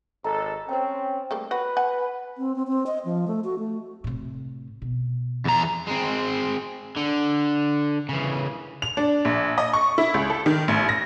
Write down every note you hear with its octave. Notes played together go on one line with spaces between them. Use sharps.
G#1 A4 D#5 A#5
C4 C#4 C5 G5
G3 A3 A#3
F#4 B4
F#5 G#5
C4
C4
C4
D#5
F3
A3
F#4
A3
A2 C3
B2
E2 A#5
G#3 C4
D3
C#3 E3
F7
D4
A#1
D#5
C#6
E4
C#2
A4
D#3
A1
A#6